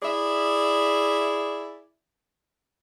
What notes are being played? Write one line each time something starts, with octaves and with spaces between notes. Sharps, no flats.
E4 G#4 D5 E5